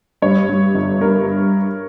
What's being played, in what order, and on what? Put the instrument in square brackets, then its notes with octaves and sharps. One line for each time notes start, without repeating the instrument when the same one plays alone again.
[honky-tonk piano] G2 [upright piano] C#5
[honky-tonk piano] G2
G1
[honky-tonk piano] G2 [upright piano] A#4